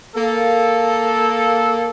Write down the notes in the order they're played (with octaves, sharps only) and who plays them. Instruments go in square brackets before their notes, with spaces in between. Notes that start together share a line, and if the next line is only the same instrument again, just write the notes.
[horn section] A#3 A4